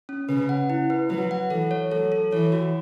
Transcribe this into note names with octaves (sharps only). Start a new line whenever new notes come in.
C#4
C#3 B4
F#5
E4
B4
F#3 B4
F#5
E3 A4
C#5
F#3 A4
A4
E3 C#5
F#4